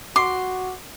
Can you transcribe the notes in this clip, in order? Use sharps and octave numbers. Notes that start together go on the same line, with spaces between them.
F#4 C6 D6